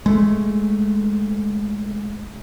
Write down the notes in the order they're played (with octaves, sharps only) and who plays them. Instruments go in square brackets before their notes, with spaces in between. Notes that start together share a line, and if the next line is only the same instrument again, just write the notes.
[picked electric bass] G#3 A3